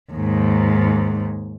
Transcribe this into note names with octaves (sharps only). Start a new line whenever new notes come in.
D#2 G#2